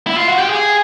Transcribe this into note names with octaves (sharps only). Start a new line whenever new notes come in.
E4
F4
F#4
G4
G#4